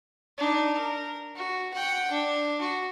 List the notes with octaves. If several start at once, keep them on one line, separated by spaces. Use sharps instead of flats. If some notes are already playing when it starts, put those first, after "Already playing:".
D4 D#4
A#4
F#4
F#5 G5
D4
F#4